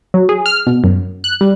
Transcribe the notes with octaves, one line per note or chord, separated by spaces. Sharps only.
F#3
G#4
F6
B2
F#2
F#6
G3